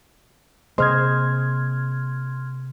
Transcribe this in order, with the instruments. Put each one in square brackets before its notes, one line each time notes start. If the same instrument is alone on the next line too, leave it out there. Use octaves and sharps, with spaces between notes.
[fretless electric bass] C3 A#3 [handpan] G#4 C5 D#5 [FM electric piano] C6 F6 G#6